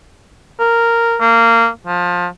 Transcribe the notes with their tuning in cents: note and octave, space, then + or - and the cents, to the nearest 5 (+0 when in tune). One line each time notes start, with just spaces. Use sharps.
A#4 -5
A#3 -20
F3 +20